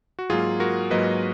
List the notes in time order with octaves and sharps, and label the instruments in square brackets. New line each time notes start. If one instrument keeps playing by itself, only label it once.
[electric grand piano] F#4
G#2 F#3 A#3 F4 G#4
F#4 A#4
G#2 F#3 A#3 B4 D#5